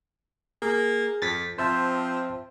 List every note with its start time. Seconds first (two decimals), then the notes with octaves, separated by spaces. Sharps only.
0.62 A#3 G#4
1.22 F2 A6 B6
1.58 F3 C4 C5 E5 A5